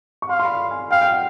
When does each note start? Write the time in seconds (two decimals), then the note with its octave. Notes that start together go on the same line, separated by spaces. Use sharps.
0.22 C#6
0.29 F5 C6
0.39 C6
0.45 B5
0.71 G#5
0.91 F5 G5
1.01 G5
1.12 F#5